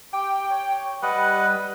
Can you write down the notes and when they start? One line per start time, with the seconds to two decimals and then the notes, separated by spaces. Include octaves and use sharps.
0.13 G4 G5
0.50 C#5
1.02 G3 B4 D#5 F#5